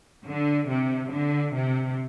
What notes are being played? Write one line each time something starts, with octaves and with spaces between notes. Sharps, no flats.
D3
C3
D3
C3